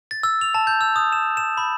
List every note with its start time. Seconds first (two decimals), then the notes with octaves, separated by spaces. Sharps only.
0.11 A6
0.23 E6
0.41 F7
0.55 A5
0.67 G6
0.81 E6
0.96 D#6
1.12 E7
1.37 E7
1.57 B5